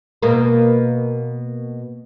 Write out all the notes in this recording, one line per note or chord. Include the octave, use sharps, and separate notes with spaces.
B2 A#3